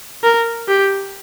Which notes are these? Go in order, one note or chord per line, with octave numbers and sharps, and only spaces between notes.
A#4
G4